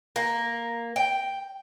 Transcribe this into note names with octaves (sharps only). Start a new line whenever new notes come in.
A#3
G5